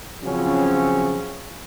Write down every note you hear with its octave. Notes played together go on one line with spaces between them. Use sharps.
C#3 F3 F#3 C4 C#4 F4